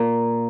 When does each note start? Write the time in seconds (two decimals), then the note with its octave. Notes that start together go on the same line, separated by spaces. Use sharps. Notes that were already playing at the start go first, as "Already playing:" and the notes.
Already playing: A#2 A#4